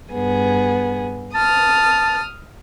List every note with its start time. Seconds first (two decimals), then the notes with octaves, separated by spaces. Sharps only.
0.12 G2 B3 G#4
1.35 A5 D#6 F6